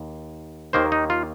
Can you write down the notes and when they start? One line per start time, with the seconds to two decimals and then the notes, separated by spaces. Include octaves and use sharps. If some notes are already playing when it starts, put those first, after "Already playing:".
Already playing: D#2
0.73 D#2 D#3 A#3 C5
0.92 D#4
1.10 F4